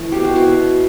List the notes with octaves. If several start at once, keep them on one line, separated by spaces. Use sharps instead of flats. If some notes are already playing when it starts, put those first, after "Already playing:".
Already playing: E3 A3 E4
B2 G4
F#4
B2 E4
B3